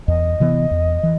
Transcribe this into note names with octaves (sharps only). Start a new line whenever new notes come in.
E2 D#5
C3 E3 B3
E2
E3